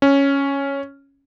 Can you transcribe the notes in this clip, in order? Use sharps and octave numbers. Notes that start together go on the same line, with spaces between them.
C#4